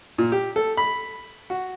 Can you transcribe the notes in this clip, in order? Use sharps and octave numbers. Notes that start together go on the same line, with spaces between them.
A#2
G4
A4
B5
F#4